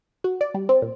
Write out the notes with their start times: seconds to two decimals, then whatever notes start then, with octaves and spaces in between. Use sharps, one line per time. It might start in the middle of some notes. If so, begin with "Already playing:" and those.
0.24 F#4
0.41 D5
0.54 G3
0.69 C4
0.82 A#2